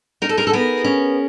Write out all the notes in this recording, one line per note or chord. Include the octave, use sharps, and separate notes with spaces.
D#4 A#4
A4
G#4 A#4
A4
B3 G#4 A#4
C#4